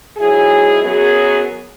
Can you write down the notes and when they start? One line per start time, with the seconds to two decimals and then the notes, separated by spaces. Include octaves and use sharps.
0.17 G#2 F#3 E4 G#4
0.80 F#2 F#3 B3 G#4